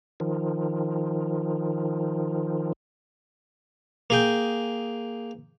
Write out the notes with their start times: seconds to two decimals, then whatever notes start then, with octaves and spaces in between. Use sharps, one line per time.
0.20 D#3 F3
4.10 A#3 G#4 G5